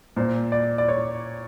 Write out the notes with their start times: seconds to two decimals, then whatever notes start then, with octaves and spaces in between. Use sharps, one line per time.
0.16 A#2 C5
0.52 D5
0.78 D5
0.88 C#5